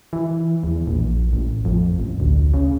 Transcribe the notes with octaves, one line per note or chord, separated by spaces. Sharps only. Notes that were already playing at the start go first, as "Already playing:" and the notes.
E3
E2
A#1
A1
F2
A1
D2
C#3